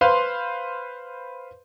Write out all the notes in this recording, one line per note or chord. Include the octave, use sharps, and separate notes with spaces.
B4 C5 F5 C6